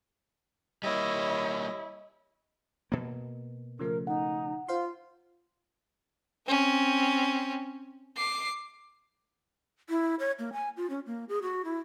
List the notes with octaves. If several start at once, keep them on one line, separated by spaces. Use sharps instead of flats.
G3 A#3 E4 C#5 D#5
B2 A#3
C#3 F3 A3 A#4
D#4 F#5
F4 C5 F5 C6
C4 C#4
D6 C7
E4
C#5
A#3
G#5
F4
C#4
A#3
G#4
F#4
E4